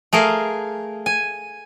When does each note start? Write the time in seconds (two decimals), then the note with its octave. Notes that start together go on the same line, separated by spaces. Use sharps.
0.13 A3 G#4 A#4 F5
1.06 G#5